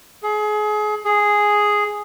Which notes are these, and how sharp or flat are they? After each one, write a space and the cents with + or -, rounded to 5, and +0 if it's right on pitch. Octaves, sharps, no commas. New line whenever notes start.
G#4 +30
G#4 +0